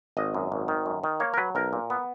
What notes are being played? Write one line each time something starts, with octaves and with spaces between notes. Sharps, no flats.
G#1 D#5
F#2
G#1
D#3
F#2
D#3
A#3 C#5
A#4
F#3 B4
B1 A#4
A#2
B3